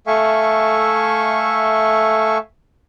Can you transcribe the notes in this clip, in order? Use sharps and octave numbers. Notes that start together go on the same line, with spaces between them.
A3 A4 E5 F5 G#5 C#6